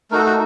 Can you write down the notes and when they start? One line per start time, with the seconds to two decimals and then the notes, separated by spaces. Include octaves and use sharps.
0.11 A3 D#4 F#4 A#4
0.19 A4
0.26 F#4